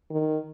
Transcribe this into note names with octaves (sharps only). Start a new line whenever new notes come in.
D#3